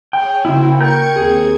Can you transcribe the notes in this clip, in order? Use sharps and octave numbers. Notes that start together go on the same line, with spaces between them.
G#4 C#5 G5
C#3 A#3 E4 F#4 C5
A#4 G5 C#6 G6 G#6 C#7
D#2 C4 G#4 G#6